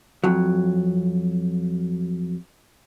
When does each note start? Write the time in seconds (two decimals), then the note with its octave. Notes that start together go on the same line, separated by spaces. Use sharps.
0.24 F2 F#3